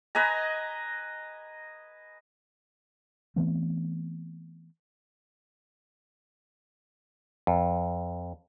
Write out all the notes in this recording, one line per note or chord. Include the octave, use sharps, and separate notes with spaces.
B4 D#5 G#5 A#5
E3 A3 B3 C4
F2